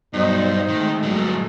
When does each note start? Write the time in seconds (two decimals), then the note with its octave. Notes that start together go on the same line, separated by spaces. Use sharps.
0.13 B1 G2 D#4 C5
0.69 G#1 D#3 G#3 A3
1.03 G1 A2 F#3